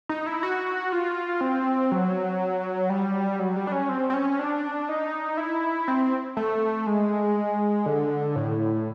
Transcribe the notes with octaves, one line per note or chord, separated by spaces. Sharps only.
D#4
E4
F#4
F4
C4
F#3
G3
F#3
G3
D4
C#4
C4
C4
C#4
D4
D#4
E4
C4
A3
G#3
D3
A2